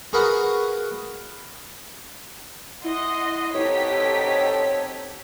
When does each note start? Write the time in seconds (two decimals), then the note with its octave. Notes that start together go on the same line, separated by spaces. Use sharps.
0.13 F#4 G#4 A#4 B4 F5 F#5
2.84 E4 D#5 F#5 C6
3.55 B2 C4 D#4 G4 A4 C#5 B6